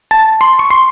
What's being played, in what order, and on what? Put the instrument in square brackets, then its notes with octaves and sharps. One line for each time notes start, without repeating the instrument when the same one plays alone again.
[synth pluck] A5
C6
C#6
C6